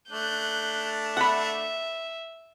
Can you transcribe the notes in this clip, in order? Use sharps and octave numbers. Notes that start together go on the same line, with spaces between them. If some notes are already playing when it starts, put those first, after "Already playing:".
A3 D4 F#6 G6
E5 F#5 B5